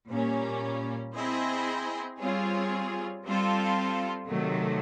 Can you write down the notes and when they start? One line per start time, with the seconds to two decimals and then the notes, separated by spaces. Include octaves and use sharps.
0.10 A#2 G3 A#3 C#4
1.16 C4 E4 G#4 C5 D#5
2.20 G3 C4 F4 G#4 C#5
3.25 G3 C4 F4 A4
4.30 C3 D#3 F#3 A3